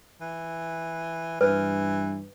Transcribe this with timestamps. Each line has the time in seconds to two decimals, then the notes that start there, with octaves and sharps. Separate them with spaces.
0.21 E3
1.41 G2 E3 B4